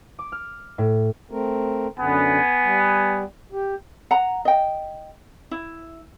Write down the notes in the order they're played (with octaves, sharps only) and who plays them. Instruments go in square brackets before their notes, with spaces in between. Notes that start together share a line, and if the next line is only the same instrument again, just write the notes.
[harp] D6
F6
A2
[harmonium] A3 C4 A#4
[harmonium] F#2 D3 [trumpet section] B3 G#5
[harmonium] G3
G4
[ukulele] F#5 A#5
D#5 G5
E4